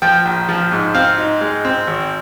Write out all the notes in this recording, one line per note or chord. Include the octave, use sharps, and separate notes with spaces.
F3 G5
A#1
F3
G#2
C4 F5
D#4
G#3
C4
G#1